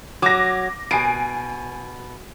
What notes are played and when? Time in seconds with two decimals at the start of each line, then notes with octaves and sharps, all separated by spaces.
0.22 F#3 D6 A#6
0.91 B2 G#5 C7 D7